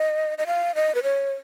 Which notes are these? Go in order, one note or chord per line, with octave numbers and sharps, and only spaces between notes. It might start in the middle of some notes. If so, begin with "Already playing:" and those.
Already playing: D#5
D#5
F5
D#5
B4
C#5